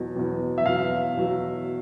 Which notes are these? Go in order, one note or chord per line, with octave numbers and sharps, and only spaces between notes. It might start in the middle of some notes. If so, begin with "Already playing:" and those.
Already playing: E2 B2 F#3
E2 B2 F#3
E5
E2 B2 F#3 F5
E2 B2 F#3